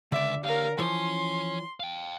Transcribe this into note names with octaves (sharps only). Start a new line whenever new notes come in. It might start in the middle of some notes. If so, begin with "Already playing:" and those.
C#2 D3 D5 E5
G4 A#4 C#5 F5
E3 F3 C#5 G#5 C6
F5 G5